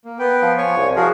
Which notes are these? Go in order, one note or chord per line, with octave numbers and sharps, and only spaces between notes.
A#3
B3 B4 G5
F3
C#5 G#5 C#6
C2
F3 F#4 G#4 A#4